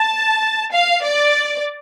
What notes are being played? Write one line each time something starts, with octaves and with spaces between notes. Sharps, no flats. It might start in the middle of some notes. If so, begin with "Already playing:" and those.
Already playing: A5
F5
D5